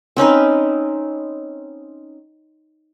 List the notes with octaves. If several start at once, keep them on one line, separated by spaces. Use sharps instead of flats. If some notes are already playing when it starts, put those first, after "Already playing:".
C4 C#4 D#4 B4